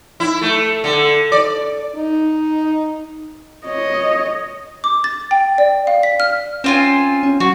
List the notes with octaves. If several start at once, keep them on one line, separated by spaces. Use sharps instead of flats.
E4
A3
D3
D5
D#4
C#5 D#5
D6
A6
G5
D5
F5
B6
F6
C4 C#4 F4 G#5
C#4
F#3 F#4